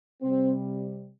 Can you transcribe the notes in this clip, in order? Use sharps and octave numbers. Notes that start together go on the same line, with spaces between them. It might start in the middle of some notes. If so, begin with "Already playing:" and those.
C3 G3 C4